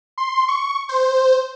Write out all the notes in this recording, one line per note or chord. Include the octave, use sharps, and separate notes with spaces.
C6
C#6
C5